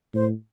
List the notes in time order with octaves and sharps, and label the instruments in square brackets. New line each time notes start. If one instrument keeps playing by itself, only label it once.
[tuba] A2 [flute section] C5